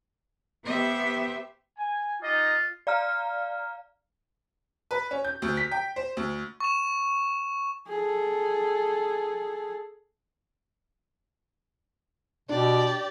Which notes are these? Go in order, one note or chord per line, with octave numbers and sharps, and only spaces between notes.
B3 G4 C5 E5
G#5
D#4 F4 G4 D#5
D5 F5 A#5 F6
B4
C#4
G6
D2
B6
G5
C5
D2
C#6 E7
G#4 A4
B2 D4 G4 D5